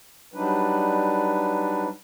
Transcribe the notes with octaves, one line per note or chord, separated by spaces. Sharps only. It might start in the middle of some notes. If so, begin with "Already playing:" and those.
F#3 G3 D4 D#4 B4